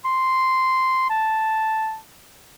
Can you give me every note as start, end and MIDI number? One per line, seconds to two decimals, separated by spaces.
0.05 1.07 84
1.10 1.98 81